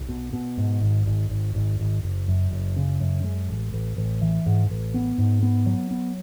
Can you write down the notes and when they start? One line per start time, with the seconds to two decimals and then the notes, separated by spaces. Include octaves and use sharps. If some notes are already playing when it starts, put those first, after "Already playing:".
Already playing: B1
0.09 B2
0.33 B2
0.58 G#2
0.81 G#1
1.06 G#1
1.30 G#1
1.54 G#1
1.79 G#1
2.03 F#1
2.28 F#2
2.51 F#1
2.76 C#3
3.00 F#2
3.24 G#3
3.49 A1
3.72 A1
3.97 A1
4.21 E3
4.46 G#2
4.70 A1
4.94 B3
5.18 G#2
5.43 B3
5.66 F#3
5.91 B3